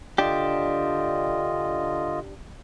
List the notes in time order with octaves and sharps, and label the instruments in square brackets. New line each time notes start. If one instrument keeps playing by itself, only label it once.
[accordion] D3 F4 D#5 [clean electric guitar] D4 G4